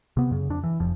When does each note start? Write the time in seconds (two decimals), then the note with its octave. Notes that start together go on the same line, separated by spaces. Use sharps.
0.17 C3 B3
0.31 F#2 C#3
0.50 F2 D4
0.64 E3
0.80 F1 F2 F3